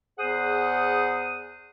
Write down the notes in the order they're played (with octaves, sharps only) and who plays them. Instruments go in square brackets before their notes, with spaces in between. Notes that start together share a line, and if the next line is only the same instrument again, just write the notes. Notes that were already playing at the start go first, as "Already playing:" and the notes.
[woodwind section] E2 G#4 C5 F#5 D#6